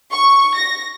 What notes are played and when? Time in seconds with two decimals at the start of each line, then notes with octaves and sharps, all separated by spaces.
0.11 C#6
0.56 A#6